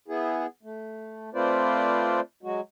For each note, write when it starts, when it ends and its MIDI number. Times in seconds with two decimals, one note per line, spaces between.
0.08 0.46 59
0.08 0.46 64
0.08 0.46 68
0.63 1.30 57
1.34 2.20 57
1.34 2.20 60
1.34 2.20 65
1.34 2.20 71
1.34 2.20 72
1.34 2.20 74
2.43 2.61 54
2.43 2.61 56
2.43 2.61 66